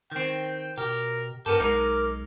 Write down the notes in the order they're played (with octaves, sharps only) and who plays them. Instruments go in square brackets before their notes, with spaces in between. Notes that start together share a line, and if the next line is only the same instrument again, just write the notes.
[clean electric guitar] D#3 C4 [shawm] G5
[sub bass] B2 [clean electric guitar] G4 [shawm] A#4
[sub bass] G2 [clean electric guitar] B3 A4 [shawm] G4 [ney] A#4
[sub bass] B1 [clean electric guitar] G#3 D#4 [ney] A#4 [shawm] D6